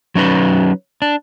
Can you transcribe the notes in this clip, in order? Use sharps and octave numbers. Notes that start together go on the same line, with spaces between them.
F#3 C#4 D#4 B4
D4